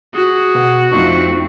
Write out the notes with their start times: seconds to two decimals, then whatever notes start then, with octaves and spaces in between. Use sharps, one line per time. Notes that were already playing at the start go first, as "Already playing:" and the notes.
0.14 F#4 G#4
0.55 B2 B3 F#5
0.92 F2 A3 C4 D4 D#4 F4 C#6